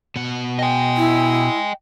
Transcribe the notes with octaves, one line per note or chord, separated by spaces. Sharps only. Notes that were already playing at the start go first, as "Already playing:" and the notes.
B2 F#5
D#5 G5 G#5
E4